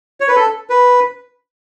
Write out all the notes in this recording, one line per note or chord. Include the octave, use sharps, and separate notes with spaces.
C#5
B4
A4
B4